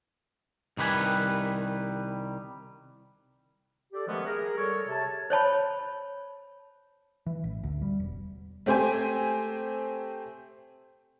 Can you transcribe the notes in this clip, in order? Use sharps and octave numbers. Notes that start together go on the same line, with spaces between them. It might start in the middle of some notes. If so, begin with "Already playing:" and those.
C2 D#3 G3 B4 G#5
G4 A4 D5
D#3 F3 G#3 A3 B3 C#4
G#4 A#4
G3 A4 A#4 C#5
C3 C#5 A5
C5 C#5 A5 B5
E3
A1
D2
G3
E1
A3 C4 G4 C5 G#5